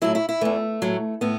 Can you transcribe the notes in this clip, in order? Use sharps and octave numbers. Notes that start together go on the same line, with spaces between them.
A2 F#3 E4
E4
E4
E2 E3 A3
A2 F#3
A2 B3